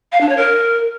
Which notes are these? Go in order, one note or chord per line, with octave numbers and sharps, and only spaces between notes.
F5
D4
C#5
A#4